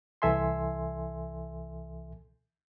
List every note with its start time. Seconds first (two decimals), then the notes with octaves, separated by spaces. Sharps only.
0.22 C2 E3 A4 E5 G#5 C6